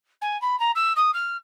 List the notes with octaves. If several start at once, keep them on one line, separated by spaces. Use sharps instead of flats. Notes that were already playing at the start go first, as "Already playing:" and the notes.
G#5
B5
A#5
E6
D#6
F6